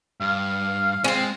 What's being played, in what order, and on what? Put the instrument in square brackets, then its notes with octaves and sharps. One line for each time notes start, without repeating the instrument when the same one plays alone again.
[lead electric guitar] G2 [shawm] F5
[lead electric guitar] G#3 [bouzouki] C4 C#4 [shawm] F4